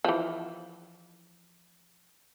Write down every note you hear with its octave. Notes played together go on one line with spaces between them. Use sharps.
E3 F3